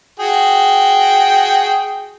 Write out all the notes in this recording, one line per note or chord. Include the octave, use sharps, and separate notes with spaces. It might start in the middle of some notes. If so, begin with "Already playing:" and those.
F#4 G#4 G5